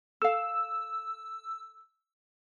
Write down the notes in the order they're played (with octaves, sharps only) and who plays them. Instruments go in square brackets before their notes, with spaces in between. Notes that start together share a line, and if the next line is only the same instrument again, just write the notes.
[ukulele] A4 F5 [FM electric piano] E6